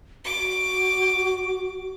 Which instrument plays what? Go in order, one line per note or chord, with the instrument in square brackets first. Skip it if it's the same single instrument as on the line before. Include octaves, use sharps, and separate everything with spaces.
[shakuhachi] F#4 [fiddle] D6